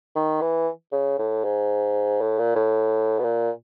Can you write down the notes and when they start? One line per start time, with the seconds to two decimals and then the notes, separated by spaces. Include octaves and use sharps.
0.16 D#3
0.41 E3
0.92 C#3
1.19 A2
1.44 G#2
2.21 A2
2.39 A#2
2.55 A2
3.19 B2
3.24 A#2